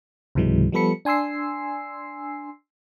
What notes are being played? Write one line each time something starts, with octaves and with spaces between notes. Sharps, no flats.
C#2 G#2 C3 E3 F#3 G#3
F3 G3 B3 A4 B5 C#7
D4 G#5 C6 E6 C7